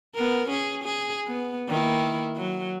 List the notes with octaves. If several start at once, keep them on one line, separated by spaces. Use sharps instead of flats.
B3 A#4
C#4 G#4
G#4
B3
D#3 A#3 E4
F#3